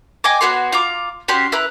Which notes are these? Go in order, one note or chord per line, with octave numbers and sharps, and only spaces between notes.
D#5 G5 G#5 D6
B3 F#4 C#5 C6
F4 A#5 D6
C#4 F#4 G4 C6
E4 B4 A#5 F#6